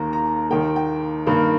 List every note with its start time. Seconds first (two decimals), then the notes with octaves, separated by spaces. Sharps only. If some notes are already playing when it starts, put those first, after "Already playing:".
Already playing: D#2 D#3 A#3 A#5
0.13 A#5
0.50 D#2 D#3 A#3 G5
0.76 G5
1.26 G2 D#3 A#3